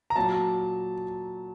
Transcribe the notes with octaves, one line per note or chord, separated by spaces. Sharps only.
A#5
A#2 F#3 A5